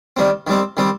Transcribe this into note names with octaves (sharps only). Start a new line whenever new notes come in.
D#3 G3 C4
D#3 G3 C4
D#3 G3 C4